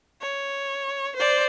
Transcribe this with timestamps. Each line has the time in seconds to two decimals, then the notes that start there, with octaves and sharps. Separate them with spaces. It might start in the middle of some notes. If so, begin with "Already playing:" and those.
0.22 C#5
1.17 C5 D5